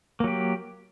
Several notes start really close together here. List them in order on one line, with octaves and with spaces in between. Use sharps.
A#3 F#3 G4